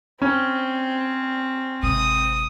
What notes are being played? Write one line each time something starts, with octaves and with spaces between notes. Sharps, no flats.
C4 C#4
G#1 C3 D#6